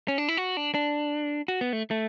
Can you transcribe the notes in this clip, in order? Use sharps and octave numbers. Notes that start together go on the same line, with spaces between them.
C#4
D4
E4
F#4
D4
D4
F#4
B3
A3
A3